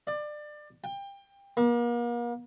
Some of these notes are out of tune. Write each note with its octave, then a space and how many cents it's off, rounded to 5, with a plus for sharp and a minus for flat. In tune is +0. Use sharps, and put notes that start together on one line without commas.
D5 +25
G5 +25
A#3 +40